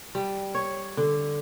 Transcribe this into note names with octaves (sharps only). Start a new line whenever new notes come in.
G3
C#5
D3